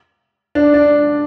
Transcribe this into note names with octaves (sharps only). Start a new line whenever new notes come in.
D4
D4